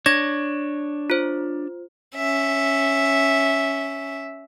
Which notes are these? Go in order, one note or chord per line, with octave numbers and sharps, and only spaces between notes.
D4 C#5 G#6 A#6
F4 C5
C#4 E5